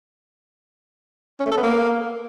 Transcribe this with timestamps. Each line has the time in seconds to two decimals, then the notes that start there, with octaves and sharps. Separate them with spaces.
1.40 C#4
1.46 A3
1.52 A4
1.57 B3
1.63 A#3